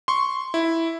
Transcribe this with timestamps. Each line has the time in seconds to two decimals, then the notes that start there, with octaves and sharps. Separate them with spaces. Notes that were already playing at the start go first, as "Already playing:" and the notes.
0.08 C6 C#6
0.54 E4